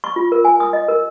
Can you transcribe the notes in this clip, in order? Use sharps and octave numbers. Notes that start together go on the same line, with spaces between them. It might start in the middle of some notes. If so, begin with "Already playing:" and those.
C#6
F4
A#4
G#5
D#6
D#5
A#4